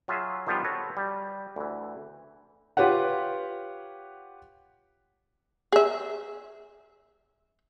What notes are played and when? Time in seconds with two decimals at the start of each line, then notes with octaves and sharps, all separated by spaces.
0.08 F#3 F4 G#4 E5
0.47 D#3 F3 G3 B3 D4 F4
0.64 F#4 A4 B4 C#5
0.97 G3
1.56 D2 E3
2.77 F4 G4 B4 C#5 F#5
5.72 G#4 E5